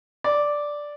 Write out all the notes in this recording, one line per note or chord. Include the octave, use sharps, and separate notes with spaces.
D5